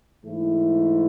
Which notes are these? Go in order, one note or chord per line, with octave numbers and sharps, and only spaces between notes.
G#2 E3 A3 E4